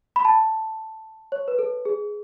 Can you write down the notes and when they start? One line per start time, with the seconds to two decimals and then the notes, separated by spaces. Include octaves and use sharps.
0.16 B5
0.25 A5
1.32 C#5
1.48 B4
1.59 A4
1.85 G#4